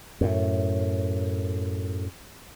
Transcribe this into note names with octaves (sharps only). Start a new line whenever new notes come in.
F#2 A2